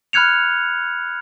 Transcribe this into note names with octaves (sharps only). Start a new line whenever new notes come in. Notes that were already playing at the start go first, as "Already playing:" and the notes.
B5 F6 F#6 G#6 C#7 F7